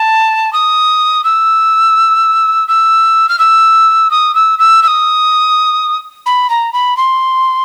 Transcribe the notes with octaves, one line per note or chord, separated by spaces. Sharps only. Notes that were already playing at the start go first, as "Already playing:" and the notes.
Already playing: A5
D#6
E6
E6
F6
E6
D#6
E6
E6
E6
D#6
B5
A#5
B5
C6